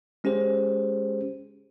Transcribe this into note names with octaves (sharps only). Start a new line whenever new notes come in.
G#3 C#4 G4 G#4 C5